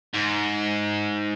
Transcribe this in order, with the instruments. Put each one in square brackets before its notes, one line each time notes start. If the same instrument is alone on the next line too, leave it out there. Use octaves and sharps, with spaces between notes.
[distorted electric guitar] G#2